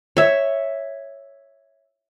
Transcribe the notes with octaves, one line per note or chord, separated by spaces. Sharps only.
C#5 E5